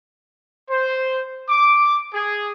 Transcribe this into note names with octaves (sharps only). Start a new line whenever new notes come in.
C5
D6
G#4